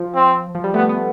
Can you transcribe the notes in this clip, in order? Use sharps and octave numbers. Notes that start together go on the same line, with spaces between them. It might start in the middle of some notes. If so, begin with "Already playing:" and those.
Already playing: F3
C4
F3
G3
A3 B3
B3